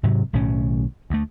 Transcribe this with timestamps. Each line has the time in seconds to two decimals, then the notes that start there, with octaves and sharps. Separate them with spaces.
0.03 G#2 C3 F#3
0.33 B1 A2 D#3 C#4
1.10 D2 A3